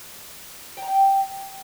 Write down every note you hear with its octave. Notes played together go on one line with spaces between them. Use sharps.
G5
A#5
G5